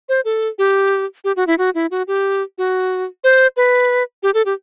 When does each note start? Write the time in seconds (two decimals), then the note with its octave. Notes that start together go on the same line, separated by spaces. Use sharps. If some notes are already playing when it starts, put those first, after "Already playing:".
0.09 C5
0.25 A4
0.58 G4
1.24 G4
1.36 F#4
1.47 E4
1.58 F#4
1.75 E4
1.91 F#4
2.08 G4
2.58 F#4
3.24 C5
3.57 B4
4.23 G4
4.34 A4
4.46 G4